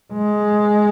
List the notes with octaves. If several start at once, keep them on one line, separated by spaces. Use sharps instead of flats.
G#3